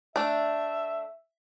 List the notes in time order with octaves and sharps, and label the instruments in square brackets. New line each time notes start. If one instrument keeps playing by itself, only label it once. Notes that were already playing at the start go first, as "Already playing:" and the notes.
[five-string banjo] A3 D4 [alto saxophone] E5